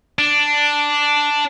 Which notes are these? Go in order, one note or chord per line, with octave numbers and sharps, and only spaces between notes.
D4